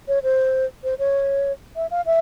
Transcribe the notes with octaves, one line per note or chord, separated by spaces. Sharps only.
C#5
C5
C5
C#5
E5
F5
E5